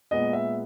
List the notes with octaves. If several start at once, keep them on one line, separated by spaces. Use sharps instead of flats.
A#2 G#3 B3 D#5
E5